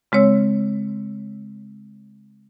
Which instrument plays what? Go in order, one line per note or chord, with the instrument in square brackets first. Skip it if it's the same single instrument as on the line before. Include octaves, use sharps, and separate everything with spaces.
[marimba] C#3 G#3 C4 C#5 E6